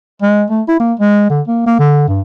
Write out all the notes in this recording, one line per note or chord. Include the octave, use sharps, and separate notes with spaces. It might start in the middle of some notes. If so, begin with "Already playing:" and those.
G#3
A3
E4
A#3
G#3
D3
A#3
A#3
D3
G2